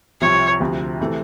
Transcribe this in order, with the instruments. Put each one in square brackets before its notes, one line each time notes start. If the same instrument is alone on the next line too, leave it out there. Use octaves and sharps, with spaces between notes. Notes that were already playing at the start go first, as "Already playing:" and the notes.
[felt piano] C2 C3 F3 [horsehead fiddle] C#5
[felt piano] D2 C3 F3
C3 E3 A3